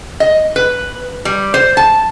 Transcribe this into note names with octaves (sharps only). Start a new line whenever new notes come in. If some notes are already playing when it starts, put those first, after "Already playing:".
D#5
B4
G3
C5
A5